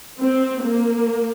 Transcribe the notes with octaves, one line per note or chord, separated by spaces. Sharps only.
C4
A#3